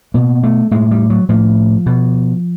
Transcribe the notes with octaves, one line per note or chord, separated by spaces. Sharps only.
B2 A#3
A3
A2 G#3
G3
F#3
A2 F3
B2